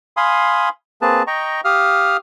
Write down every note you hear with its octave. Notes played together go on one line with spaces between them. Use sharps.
F5 G#5 B5 C6 D#6
A#3 C4 G#4 B4 A5
D#5 G5 A#5 C#6
G4 F5 D#6 F6